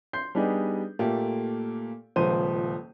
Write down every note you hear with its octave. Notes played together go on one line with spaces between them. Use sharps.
C6 G6 C7
G3 B3 D4 D#4 G4 G#4
A#2 A3 A#3 G4 A4
D#1 C#2 F3 C5 D#7